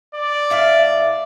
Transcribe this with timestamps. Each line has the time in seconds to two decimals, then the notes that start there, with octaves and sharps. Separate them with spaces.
0.15 D5
0.50 A2 E5 F5